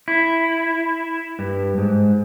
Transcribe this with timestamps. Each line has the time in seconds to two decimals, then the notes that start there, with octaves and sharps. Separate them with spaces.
0.08 E4
1.39 G2
1.78 G#2